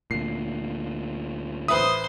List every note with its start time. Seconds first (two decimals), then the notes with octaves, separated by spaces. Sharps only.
0.11 D2 A#2 C7
1.68 A1 B4 C5 E5 D#6